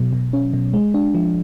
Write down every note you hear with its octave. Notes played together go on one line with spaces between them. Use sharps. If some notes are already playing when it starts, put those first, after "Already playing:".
Already playing: B2 F#3
B2
C#4
B2
G#3
D4
F3